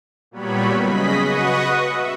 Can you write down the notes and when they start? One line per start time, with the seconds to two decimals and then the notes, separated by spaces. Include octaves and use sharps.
0.31 A#2 F#3 G3 B3 C#5 B5
0.81 C#3 G#4 D#5 B5 B6
1.15 F#4 B4 D#5 F#5 C#6 D#6
1.83 E5